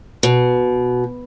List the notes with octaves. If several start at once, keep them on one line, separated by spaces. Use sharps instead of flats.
B2